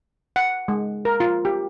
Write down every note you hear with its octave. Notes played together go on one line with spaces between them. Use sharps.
F#5
G#3
A#4
F4
G4